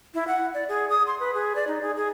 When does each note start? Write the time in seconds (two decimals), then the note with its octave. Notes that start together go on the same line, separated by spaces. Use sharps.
0.14 E4
0.27 F#5
0.54 D5
0.68 G#4
0.90 D#6
1.07 C6
1.20 B4
1.34 G#4
1.55 D5
1.67 D#4
1.81 G#4
1.97 G#4